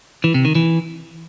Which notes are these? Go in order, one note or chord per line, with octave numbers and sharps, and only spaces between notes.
E3
C3
D#3
E3